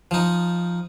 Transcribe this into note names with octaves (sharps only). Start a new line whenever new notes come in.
F3 D#4